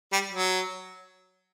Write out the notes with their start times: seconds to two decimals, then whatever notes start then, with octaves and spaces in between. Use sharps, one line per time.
0.12 G3
0.32 F#3